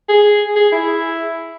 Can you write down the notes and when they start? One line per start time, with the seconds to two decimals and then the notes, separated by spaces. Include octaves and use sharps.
0.09 G#4
0.56 G#4
0.72 E4